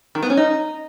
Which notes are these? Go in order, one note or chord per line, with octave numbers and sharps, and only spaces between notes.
D#3
B3
C#4
D#4